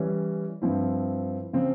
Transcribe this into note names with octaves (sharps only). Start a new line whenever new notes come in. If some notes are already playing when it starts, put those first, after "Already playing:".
Already playing: E3 G3 C#4
G2 F3 C4 E4
C#3 F3 C4